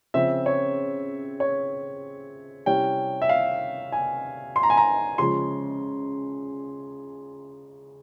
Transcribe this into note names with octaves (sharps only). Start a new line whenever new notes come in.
C#3 F3 C4 E5
C#5
C#5
C3 G3 C#4 E4 G5
E5
F5
G#5
C6
A#5
G#5
A#5
C#3 F3 G#3 C6